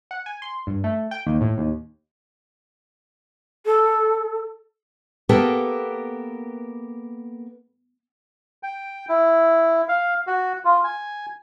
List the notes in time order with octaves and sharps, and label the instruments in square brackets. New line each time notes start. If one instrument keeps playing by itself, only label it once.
[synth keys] F#5
G#5
C6
G2
A3
G5
D#2
A2
D#2
[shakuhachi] A4
[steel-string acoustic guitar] A#3 B3 G4 A4 A#4
[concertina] G5
E4
F5
F#4
F4
G#5